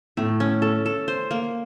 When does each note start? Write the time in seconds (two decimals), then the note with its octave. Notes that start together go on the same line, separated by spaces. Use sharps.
0.17 A2 A3
0.40 C#4
0.62 A4
0.86 A4
1.08 C5
1.31 A#3